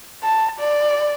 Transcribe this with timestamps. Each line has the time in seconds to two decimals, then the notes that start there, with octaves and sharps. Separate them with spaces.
0.23 A5
0.59 D5